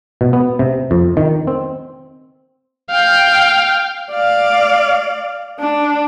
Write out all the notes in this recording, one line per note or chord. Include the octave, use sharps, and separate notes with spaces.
B2
B3
C3
F2
D#3
C4
F5 G5
D5 F5
D4